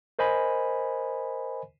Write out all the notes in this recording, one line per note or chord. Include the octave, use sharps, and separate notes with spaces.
A#4 C5 D#5 G#5 B5